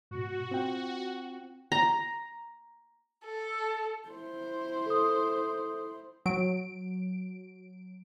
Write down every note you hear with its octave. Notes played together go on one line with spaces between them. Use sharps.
G#2 B2 F#4
C4 F4 G5
A#5
A4
E4 C5
A4 D#6
F#3 D7